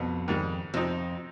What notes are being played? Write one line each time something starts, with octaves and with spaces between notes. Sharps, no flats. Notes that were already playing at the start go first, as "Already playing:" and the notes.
Already playing: C2 F2 B2 B3
G#2 D#3 G3
F2 C3 F3 C4 D#4